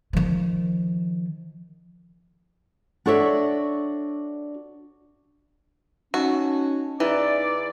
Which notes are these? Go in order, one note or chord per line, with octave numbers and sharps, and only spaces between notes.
D#3 F3
D4 F#4 A4 C#5 D5 E5
C#4 D#4 F#4
E2 E3 D#4 E4 D5